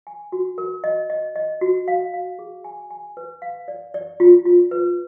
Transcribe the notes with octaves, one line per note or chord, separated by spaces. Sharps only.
G#5
F#4
A#4
D#5
D#5
D#5
F#4
F5
F5
G#4
G#5
G#5
B4
F5
D5
D5
F4
F4
B4